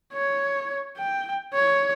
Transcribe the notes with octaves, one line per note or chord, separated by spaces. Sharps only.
C#5
G5
C#5